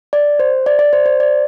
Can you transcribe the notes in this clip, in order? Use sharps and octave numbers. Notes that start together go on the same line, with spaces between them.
D5
C5
D5
D5
C5
C5
D5